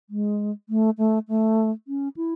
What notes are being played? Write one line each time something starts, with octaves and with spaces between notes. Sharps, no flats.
G#3
A3
A3
A3
C#4
E4